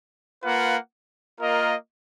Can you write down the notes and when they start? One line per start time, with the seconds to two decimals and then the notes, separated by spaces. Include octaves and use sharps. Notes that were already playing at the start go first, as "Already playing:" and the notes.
0.43 A#3 F4 B4 F#5
1.40 A#3 F4 A#4 D#5